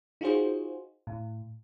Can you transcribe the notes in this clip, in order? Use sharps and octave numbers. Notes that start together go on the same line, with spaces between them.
D#4 F4 F#4 G#4 C5
A2